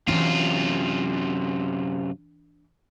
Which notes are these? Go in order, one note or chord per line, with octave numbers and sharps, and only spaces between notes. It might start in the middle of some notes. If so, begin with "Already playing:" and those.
F#2 C3 E3 D4 F4